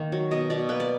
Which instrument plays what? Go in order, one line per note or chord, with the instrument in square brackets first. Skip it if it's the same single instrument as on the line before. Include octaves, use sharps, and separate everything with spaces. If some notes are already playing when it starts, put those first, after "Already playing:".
Already playing: [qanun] D#3 A#3
F#3
B2 D#5
B2 D5
A#3 B4
D5